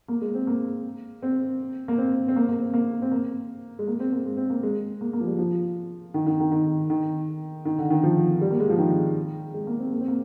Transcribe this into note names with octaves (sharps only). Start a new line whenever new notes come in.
A#3
G#3
C4
A#3
C4
A#3
C4
C4
A#3
A#3
C4
A#3
C4
A#3
G#3
A#3
C4
A#3
G#3
C4
A#3
G#3
A#3
A#3
F3
G3
F3
D#3
D#3
D#3
D#3
D#3
D#3
D3
D#3
F3
G3
A#3
G#3
F3
D#3
G#3
A#3
C4
A#3
C4
A#3